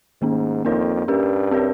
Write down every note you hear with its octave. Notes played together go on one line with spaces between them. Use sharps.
G#2 D#3 A#3 C#4
F2 A#3 D#4 A#4 C#5
G2 C#4 G4 A#4
C4 G4 A#4 C#5